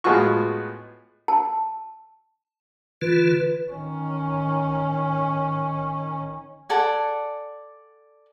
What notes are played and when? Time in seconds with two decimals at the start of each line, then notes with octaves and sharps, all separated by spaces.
0.04 A2 G#3 B3 F4 F#4 C#6
1.28 A5
3.02 D3 E3 F4 B4
3.71 D#3 C#4
6.69 A4 D5 F#5 G#5